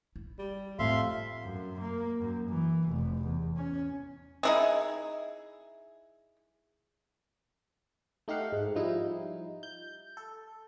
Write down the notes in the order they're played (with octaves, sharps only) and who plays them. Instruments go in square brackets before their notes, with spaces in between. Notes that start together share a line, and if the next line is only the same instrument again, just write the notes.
[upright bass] E4
[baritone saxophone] G3
[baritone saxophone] F2 [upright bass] A2 [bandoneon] E5 F5 C6
[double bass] F#2
A#3
F#2
E3
F1
E2
C#4
[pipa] D#4 E4 G#4
[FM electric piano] A3 D#4 G4 F5 F#5
G#2
F3 G3 D#4 E4
G6
A4